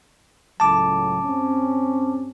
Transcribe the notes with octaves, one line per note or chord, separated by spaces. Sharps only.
C#2 A2 F#3 A5 D6
G2 C4 C#4